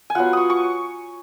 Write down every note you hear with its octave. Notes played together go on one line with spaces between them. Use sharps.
G#5
F#3 B3 F4 F#5
C#6 D#6
C#6